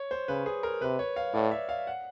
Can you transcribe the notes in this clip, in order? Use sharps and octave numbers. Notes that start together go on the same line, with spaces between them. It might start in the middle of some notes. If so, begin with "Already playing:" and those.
Already playing: C#5
C5
C#3 B4
G#4
A#4
C3 B4
C#5
F5
A2 D5
E5
F5
F#5